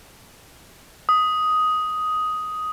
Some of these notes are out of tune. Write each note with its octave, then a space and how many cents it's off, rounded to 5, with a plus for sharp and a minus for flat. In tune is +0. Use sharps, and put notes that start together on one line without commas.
D#6 +10